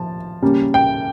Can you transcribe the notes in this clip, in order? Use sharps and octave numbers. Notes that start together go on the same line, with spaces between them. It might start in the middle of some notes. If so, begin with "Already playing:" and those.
Already playing: F3 A5
C#3 G3 A#3 C#4
G5